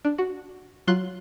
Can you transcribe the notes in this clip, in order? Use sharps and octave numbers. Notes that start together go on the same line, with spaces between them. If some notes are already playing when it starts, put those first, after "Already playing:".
D4
F#4
F#3 F4 C6 F#6